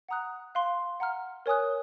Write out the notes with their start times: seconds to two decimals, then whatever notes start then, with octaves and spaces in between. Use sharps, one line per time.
0.09 F#5 A#5 D#6 F#6
0.55 F5 C6 F#6
1.00 F#5 A#5 F6
1.46 A#4 C#5 G#5 D#6 F#6